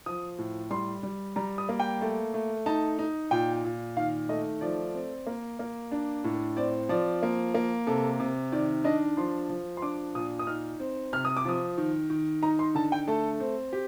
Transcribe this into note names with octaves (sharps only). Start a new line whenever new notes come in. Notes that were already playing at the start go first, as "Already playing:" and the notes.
F3 D#6
A2
G3 C6
G3
G3 A#5
D#6
A#3
G5
A3
A3
D#4 A5
D#4
A#2 G5
A#2
D#3 F5
A3 D#5
F3 D5
C4
A#3
A#3
D4
A2
C4 D5
F3 D5
A#3
A#3
C3 A4
C3
D#3 D5
D4 D#5
F3 C6
F3
C6
D4 D6
A#2 D#6
D#6
D#4 F6
C4
C3 F6
D#6
D6
F3 D#6
D#3
D#3
D#4 A#5
C6
D3 A5
G5
A3 A4
C4
G4